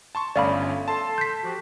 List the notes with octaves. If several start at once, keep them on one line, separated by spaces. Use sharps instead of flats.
A5 C6 C#6
G1 A3 C#4 D5 F5 B5
A4 A5 C6
G6 B6
F3 F#4 G4